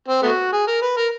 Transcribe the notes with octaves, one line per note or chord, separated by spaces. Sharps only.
C4
A3 B3 F#4
G#4
A#4
B4
A#4